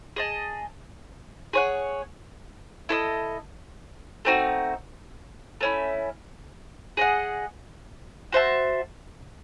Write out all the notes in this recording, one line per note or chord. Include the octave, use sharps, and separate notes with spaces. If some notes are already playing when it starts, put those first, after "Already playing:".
G#4 D#5 A5
G#4 C#5 F#5
E4 A4 D#5
A3 C4 D#4 F#4
A3 C#4 E4
G#4 D#5 F#5
F#4 C5 E5 A5